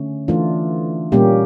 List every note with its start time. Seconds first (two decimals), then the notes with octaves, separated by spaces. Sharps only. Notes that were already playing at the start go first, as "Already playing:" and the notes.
Already playing: D3 A3 C#4
0.28 E3 A3 D4 F4
1.12 A#2 G3 A#3 C#4 G4